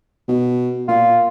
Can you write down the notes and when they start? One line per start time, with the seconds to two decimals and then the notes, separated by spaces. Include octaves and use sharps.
0.28 B2
0.88 A#2 F4